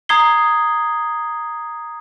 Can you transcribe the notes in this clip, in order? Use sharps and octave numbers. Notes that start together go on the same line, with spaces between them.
A#5 D#6 G#6 C7 G7